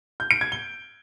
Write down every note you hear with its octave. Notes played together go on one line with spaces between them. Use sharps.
G6
D7
G#6
G7